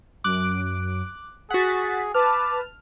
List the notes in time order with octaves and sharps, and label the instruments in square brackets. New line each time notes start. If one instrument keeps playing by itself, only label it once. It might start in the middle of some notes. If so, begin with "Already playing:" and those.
[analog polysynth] F#2 D7 [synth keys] D6 F#6
[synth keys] F#4 F#5 [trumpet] G#4 [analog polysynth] A6 B6
[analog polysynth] B4 A5 [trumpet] D6 [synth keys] F6